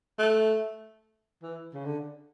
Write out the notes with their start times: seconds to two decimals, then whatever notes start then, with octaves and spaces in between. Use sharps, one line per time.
0.19 A3
1.43 E3
1.74 C#3
1.85 D3